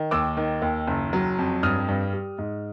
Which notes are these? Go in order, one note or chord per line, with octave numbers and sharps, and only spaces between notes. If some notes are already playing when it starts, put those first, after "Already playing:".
Already playing: D#3
D#2 D6 E6
D#3
D#2
F#1
F#3
F2
G2 D#6 F6
G2
G3
G#2